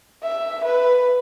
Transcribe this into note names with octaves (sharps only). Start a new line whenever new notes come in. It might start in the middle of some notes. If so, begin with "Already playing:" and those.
E5
B4